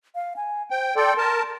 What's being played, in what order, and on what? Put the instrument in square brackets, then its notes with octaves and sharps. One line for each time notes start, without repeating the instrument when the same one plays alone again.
[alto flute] F5
G#5
[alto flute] C5 [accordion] G5
[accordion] A4 D5 G5 [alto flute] C6
[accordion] A#4 A5